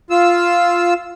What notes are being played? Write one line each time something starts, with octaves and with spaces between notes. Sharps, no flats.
F4 E6